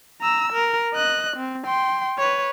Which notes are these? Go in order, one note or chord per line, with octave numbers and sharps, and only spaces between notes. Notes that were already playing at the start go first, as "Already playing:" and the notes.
A#5 E6
A#4
D#5 F#6
C4
G5 C6
B4 C#5